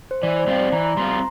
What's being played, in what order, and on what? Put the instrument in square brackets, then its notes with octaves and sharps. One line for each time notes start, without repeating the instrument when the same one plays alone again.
[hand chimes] C5
[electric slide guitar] E3 [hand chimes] D5
[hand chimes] C5
[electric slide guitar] G3 C4 F4
[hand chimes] D5
[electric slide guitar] E3 [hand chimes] A#5
[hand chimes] A#5
[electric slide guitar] G3 C4 F4 [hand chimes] C6
[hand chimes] A#5